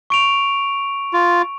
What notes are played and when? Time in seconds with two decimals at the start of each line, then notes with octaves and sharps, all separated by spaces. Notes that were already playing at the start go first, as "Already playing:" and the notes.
0.10 C#6 D7 F7
1.13 F4